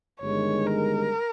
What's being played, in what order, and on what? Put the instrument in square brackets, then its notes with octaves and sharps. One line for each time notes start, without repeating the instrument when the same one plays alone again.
[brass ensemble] G1 G2 D#3 G#3 [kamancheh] C#5
[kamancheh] A#4